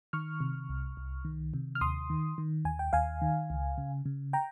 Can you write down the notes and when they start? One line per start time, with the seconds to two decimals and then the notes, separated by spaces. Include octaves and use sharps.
0.13 D#3 C#6 F6
0.41 C3
0.69 C2
0.97 C2
1.25 D#3
1.54 C3
1.75 F6
1.81 D#2 C6 D#6
2.10 D#3
2.38 D#3
2.65 D#2 G#5
2.79 G5
2.93 D#2 F5 G#5
3.22 D#3
3.50 C#2
3.78 C#3
4.06 C#3
4.33 G5 A#5